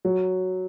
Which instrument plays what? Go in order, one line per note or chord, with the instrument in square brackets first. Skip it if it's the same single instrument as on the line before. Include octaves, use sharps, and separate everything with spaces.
[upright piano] F#3